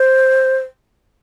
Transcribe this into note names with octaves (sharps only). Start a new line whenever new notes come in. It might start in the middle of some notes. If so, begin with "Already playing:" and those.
Already playing: C5